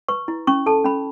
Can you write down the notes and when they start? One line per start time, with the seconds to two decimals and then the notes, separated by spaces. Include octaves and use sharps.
0.08 B4 C#6
0.28 E4
0.47 C#4 C#6
0.66 A4 A5
0.85 C#4 B5